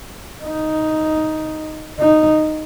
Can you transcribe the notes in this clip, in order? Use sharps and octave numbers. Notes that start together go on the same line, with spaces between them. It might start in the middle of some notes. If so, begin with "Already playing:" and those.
D#4
D#4